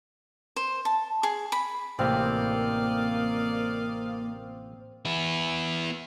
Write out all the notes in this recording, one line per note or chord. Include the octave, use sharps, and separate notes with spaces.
C5
A5
G#4
B5
A1 A2 C3 A#3 C4 D5 D#5 F5
B3 E4